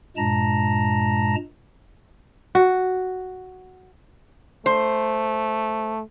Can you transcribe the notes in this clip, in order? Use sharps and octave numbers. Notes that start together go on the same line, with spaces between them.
G2 A#2 G#3 A5 A#5 A#6
F#4
A3 C5